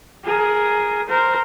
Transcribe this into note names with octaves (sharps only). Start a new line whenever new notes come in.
G#4 A#4
A#4 C5